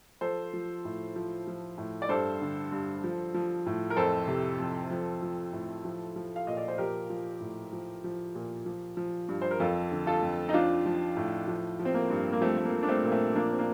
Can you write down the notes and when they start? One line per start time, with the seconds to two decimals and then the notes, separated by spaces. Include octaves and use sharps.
0.21 F3 A4 C5
0.53 F3
0.85 A2
1.16 F3
1.47 F3
1.78 A2
2.02 D5
2.09 G2 A4 C5
2.41 D3
2.72 G2
3.04 F3
3.34 F3
3.66 A2
3.90 A#4
3.97 F2 A4 C5
4.28 C3
4.60 F2
4.90 F3
5.23 F3
5.53 A2
5.85 F3
6.16 F3
6.36 F5
6.47 A#2 D#5
6.57 D5
6.68 C5
6.78 F3 G4 A#4
7.10 F3
7.40 A2
7.73 F3
8.04 F3
8.35 A#2
8.66 F3
8.97 F3
9.29 G2
9.41 C5
9.51 A#4
9.60 F2 F4 A4
9.91 D3
10.07 F4 A4
10.23 F2
10.49 D#4
10.53 F3 D4 F4
10.86 F3
11.16 A2
11.48 F3
11.79 F3
11.85 C4
11.94 A#3
12.10 G2
12.32 A#3
12.41 F3 A3 C4
12.57 A3
12.65 A#3
12.73 F3
12.83 D4
12.89 A3 C4
13.03 A#2 A#3
13.11 A3 C4
13.35 F3 A#3 D4
13.52 C4
13.58 A#3 D4